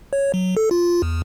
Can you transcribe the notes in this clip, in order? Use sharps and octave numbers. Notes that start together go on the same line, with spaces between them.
C#5
F#3
A4
F4
E2